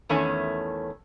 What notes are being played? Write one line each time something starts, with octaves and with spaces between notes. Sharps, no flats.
E2 D#3 A3 C#4